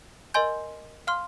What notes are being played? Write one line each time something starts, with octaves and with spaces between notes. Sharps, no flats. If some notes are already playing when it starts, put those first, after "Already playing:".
A#4 D#5 G#5 C6 G6
F5 C6 F6